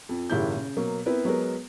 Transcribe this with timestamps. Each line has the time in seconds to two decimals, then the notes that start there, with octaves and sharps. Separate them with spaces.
0.09 F2
0.30 F#1 G#2 D#3 E4 G4 G6
0.56 C#3
0.76 B2 F#3 A#3
1.06 B3 C4 E4 A#4 B4
1.25 F#3 G#3 B3 A#4